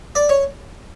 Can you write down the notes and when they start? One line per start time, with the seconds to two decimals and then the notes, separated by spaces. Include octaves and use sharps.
0.15 D5
0.29 C#5